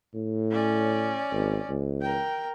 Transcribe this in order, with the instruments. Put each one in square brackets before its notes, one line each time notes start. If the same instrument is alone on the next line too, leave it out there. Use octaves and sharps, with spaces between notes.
[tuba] A2
[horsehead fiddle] C#4 D5
[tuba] G#1
C#2
[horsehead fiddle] A#4 G5